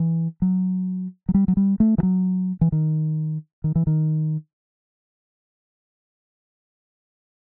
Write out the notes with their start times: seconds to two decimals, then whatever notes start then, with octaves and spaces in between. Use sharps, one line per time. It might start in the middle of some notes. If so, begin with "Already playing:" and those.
Already playing: E3
0.42 F#3
1.29 F#3
1.34 G3
1.48 F#3
1.57 G3
1.80 A3
1.98 E3
2.03 F#3
2.61 E3
2.72 D#3
3.64 D#3
3.76 E3
3.87 D#3